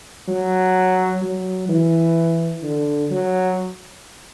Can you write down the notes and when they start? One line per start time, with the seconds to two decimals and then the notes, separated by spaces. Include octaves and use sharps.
0.28 F#3
1.22 F#3
1.69 E3
2.63 D3
3.11 F#3